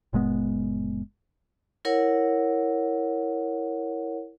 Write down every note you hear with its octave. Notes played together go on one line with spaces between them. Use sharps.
F#1 A#2 G#3 B3
E4 A#4 C#5 F#5